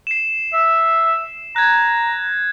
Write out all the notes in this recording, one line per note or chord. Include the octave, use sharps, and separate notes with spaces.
C7 E7
E5
A#5 F#6 G#6